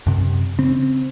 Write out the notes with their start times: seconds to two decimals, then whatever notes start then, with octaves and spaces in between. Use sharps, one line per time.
0.07 F#2 C3
0.58 C#3 C4